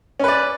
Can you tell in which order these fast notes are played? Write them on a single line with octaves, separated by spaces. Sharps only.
C#4 B4 D5